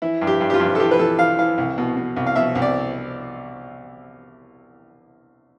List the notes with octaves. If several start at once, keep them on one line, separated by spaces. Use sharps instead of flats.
E3 E4
G2
G4
G2
G4
F4
G2
A4
E3 G4
B4
E3 A4
E3 F5
E3 F5
C2
B2
B2
C2
F5
B2 E5
C2
D5